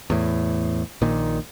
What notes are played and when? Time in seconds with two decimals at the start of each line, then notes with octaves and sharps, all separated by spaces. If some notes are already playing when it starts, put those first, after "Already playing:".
0.10 E2 A2
1.01 A#1 A#2 D#3